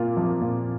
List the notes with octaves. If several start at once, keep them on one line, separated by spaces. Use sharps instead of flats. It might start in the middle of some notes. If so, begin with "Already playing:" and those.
Already playing: A#2 A#3 F4
F3
A#2